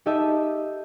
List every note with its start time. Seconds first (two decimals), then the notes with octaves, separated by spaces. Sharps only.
0.06 D#4 G4 A4 D#5 E5